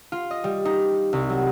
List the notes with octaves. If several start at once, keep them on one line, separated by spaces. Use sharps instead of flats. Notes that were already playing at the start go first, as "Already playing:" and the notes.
F4
D#5
G3
D#4
C2
F#3